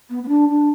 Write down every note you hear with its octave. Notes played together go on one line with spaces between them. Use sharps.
B3
B3
D4
D4